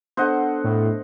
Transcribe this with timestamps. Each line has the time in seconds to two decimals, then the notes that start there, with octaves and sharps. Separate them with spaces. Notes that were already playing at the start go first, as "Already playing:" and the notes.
0.17 B3 D4 A4 C5 D#5 F#5
0.64 A2